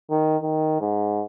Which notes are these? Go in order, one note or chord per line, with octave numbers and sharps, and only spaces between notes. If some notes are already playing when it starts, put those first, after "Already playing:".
D#3
D#3
G#2